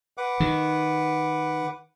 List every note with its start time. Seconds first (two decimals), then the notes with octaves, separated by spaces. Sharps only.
0.18 B4 F#5 D6
0.40 D#3